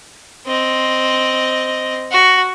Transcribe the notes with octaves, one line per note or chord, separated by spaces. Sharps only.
C4 D#5
F#4